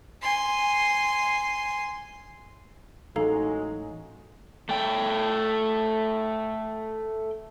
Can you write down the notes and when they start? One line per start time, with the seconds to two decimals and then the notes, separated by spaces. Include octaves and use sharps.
0.22 G#5 C6
3.16 A1 F#3 G#3 D#4 A4 F5 A#5
4.69 A3 G5